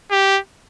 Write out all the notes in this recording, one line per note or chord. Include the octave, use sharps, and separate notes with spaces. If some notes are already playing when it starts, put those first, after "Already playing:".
G4